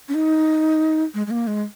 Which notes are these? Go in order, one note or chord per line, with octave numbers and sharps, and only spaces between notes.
C#4
D#4
G#3
G#3
A#3
G#3